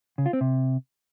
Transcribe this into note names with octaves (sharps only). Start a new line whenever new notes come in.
C#3
F4
C4
C3